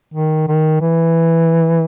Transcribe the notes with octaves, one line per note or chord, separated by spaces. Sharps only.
D#3
D#3
E3